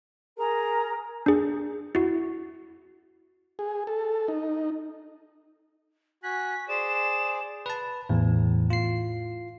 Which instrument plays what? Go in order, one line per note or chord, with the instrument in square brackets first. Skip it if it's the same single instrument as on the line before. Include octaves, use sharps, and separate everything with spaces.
[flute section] G#4 A#4 A#5
[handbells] D4 G#4
E4 F#4
[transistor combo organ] G#4
A4
D#4
[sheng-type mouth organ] F#4 G#5 F#6 [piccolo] B6
[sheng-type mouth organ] G#4 C5 D5 [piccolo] E7
[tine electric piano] B4 A5
[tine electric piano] E2 [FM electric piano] A2
[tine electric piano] F4 C7